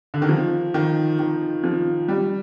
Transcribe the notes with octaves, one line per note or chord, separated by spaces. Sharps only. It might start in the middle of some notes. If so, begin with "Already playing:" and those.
D3
D#3
F3
D#3
D#3
F3
G3